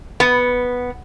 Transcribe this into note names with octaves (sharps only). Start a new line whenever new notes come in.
B3